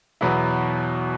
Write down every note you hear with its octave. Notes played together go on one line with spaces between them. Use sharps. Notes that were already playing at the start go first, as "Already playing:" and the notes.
E2 B2 F#3 B3 E4